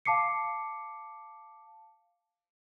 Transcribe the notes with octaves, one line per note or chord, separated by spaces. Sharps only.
F5 A5 D6 C7 C#7